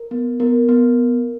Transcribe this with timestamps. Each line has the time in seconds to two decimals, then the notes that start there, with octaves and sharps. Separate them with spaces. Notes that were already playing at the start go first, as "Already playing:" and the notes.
Already playing: A#4
0.11 B3
0.40 B3 A#4
0.69 B3